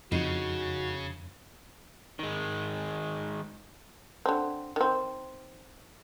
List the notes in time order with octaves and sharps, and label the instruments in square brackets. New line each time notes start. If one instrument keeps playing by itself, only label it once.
[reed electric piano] F2 [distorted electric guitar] C#3 [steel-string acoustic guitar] D#4 [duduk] F#4
[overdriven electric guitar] D#3 G#3
[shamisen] D3 C4
D#3 C4